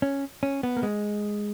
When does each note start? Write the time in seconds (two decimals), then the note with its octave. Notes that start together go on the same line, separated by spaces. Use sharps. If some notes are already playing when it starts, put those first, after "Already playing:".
0.02 C#4
0.43 C#4
0.63 B3
0.77 A#3
0.83 G#3